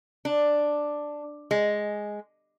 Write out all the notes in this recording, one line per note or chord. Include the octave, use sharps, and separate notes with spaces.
D4
G#3